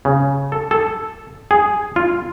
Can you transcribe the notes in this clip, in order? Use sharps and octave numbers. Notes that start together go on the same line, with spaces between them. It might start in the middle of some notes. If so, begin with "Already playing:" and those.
C#3
A4
A4
G#4
F4